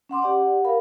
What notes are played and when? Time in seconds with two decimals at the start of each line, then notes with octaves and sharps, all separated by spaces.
0.09 C#4 F#5 C6 D6
0.22 G4 D5 F#5
0.65 A#4 F5 B5